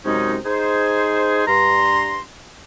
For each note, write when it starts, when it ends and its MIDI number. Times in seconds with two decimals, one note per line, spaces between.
0.06 0.36 42
0.06 0.36 48
0.06 0.36 56
0.06 0.36 61
0.06 0.36 63
0.46 1.47 63
0.46 1.47 68
0.46 1.47 72
1.48 2.20 43
1.48 2.20 82
1.48 2.20 84